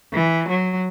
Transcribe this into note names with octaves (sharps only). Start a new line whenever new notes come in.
E3
F#3